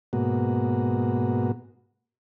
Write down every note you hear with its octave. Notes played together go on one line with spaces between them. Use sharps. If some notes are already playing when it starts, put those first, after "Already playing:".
G#2 B2 A#3 F#4